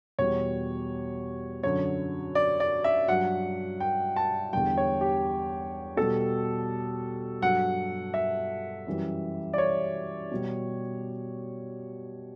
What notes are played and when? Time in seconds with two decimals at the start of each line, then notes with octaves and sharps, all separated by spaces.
0.19 E2 B2 G3 C#5
1.63 F#2 D3 F#3 C#5
2.35 D5
2.60 D5
2.84 E5
3.08 G2 F#3 F#5
3.80 G5
4.16 A5
4.53 E2 D3 G3 G5
4.77 C#5
5.01 G4
5.97 B2 G3 A4
7.41 G2 F#3 F#5
8.14 E5
8.87 F#2 E3 G3
9.53 D5
9.58 C#5
10.31 B2 G3